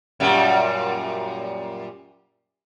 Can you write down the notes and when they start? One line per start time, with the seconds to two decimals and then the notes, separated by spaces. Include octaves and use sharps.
0.20 F#2 A#2 G3